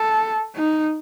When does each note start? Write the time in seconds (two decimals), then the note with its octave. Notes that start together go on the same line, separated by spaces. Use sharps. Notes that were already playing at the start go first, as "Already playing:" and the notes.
Already playing: A4
0.56 D#4